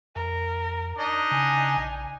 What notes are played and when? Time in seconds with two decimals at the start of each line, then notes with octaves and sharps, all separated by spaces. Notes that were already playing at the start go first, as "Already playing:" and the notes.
0.16 F2 A#4
0.99 D4 D#4 D#5
1.31 C#3 G#5
1.77 A#1